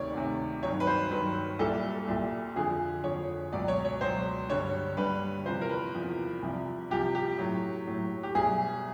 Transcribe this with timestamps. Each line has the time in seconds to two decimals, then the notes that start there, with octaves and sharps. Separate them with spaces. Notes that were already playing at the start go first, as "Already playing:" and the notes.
Already playing: D2 C3 D#3 C#5 D5
0.14 D2 C3 D#3
0.63 G2 D#3 F#3 C#5
0.80 B4
0.87 C5
1.11 G2 D#3 F#3 B4
1.59 C2 A#2 G3 A4
2.08 C2 A#2 G3
2.56 F2 D3 F3 G#4
3.04 F2 D3 F3 C#5
3.53 C#2 B2 F#3 D5
3.68 C#5
3.85 C#5
4.01 C#2 B2 F#3 C5
4.49 G2 D3 G3 C#5
4.97 G2 D3 G3 B4
5.46 E2 C3 F3 C5
5.61 A#4
5.69 B4
5.94 E2 C3 F3
6.43 C2 C3 F3
6.91 C2 C3 F3 G4
7.15 G4
7.38 A2 F#3
7.87 A2 F#3
8.23 G4
8.35 C2 B2 F#3 G#4